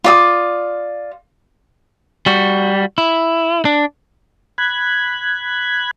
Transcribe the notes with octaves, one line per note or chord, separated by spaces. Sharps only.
F4 D5 D#6
G3 F#4
E4
D4
B5 F#6 G#6